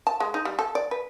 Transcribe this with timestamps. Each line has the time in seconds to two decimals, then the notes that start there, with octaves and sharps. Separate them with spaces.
0.07 A5
0.20 G#3
0.34 D#4
0.45 G3
0.59 A4
0.75 D5
0.91 B4